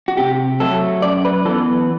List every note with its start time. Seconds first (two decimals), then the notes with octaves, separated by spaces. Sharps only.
0.08 F#4
0.17 C3 G4
0.60 F#3 A3 A4
1.02 F#2 D5
1.25 B4
1.45 E3 A4
1.49 B3